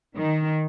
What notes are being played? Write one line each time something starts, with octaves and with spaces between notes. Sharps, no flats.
D#3